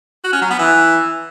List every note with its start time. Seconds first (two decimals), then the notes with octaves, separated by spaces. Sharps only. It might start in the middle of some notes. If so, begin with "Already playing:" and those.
0.24 F#4
0.33 C#4
0.42 F#3
0.50 B3
0.59 E3